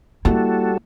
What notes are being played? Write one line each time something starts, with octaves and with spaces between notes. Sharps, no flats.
G3 A#3 E4 F#4 A4